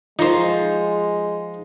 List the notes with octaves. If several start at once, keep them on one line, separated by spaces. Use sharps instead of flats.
F3 G#3 D#4 C5